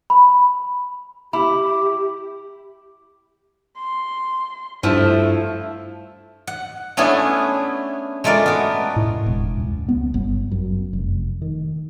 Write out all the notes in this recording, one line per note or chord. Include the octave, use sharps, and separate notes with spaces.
B5
E4 G4 B5 D6
C6
G2 F3 A3 E4 A5
F#5
A3 B3 C#4 D4 E4 G#4
G#3 A3 F4 A#4 D5
B3 F#4
A2
E1
C#2
B3
G1
F#2
F1
D#3